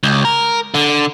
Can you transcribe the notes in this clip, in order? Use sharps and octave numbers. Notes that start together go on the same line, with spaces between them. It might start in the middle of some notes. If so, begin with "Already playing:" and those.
C#2
A#4
D3